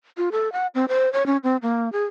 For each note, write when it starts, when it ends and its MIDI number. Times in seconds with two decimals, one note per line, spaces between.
0.17 0.29 65
0.32 0.51 69
0.53 0.67 78
0.75 0.85 60
0.89 1.11 72
1.13 1.26 73
1.26 1.37 61
1.44 1.57 60
1.62 1.92 58
1.92 2.04 68